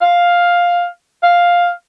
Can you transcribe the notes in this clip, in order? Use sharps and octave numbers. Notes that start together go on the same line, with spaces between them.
F5
F5